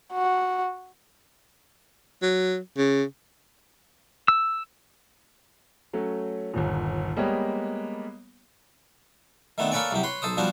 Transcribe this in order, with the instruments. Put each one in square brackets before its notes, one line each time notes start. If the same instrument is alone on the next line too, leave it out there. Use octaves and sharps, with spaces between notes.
[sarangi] F#4
[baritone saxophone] F#3
C#3
[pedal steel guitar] E6
[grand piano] F#3 A3 C#4
G1 D#2 A#2
G3 G#3 A#3 B3 G4 C#5
[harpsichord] D#3 A3 B3 C4 D4
A#3 A4 B4 C#5 D5 G#5
C2 C3 F#3 G4
B4 C#5 C6
B1 A4 C5 D#6
F3 G3 B3 D4 F#4 C5